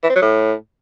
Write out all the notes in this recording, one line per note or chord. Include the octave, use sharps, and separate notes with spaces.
E3
C4
F#3
A2